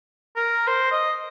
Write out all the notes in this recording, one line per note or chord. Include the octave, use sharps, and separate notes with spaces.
A#4
C5
D#5